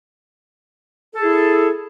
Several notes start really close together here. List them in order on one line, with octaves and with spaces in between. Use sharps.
A4 G#4 E4